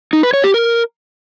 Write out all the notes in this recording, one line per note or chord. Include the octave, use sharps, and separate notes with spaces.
D#4
B4
C#5
G4
A#4